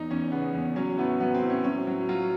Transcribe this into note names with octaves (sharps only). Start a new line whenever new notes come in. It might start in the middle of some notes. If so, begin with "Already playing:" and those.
Already playing: E2 D#4
E2 C#4
C#3 B3
E2
F#3 C#4
A2 B3
F#3 B3
C4
A2
C#4
F#3 C#4
F#3
F#3 F4